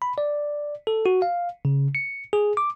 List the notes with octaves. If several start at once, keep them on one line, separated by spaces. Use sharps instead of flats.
B5
D5
A4
F#4
F5
C#3
C#7
G#4
D6